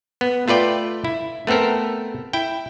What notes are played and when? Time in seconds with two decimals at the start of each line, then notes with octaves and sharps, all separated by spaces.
0.21 B3
0.48 A3 F4 B4 D5 G5
1.05 E4
1.47 A3 B3 C4 A4 A#4
2.33 E4 G5